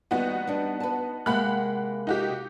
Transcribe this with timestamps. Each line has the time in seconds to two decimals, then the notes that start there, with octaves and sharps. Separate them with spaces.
0.11 D#2 G3 B3 D#4 F#4
0.47 G3 D4
0.80 B4 A5
1.26 C3 G#3 A#3 F#5 B5 F#6
2.07 D#4 F#4 G4